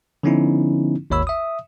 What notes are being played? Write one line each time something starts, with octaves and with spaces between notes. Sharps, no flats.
D3 F3 B3 C#4 D#4 E4
G#1 D#2 C#5 B5 E6
E5 D#6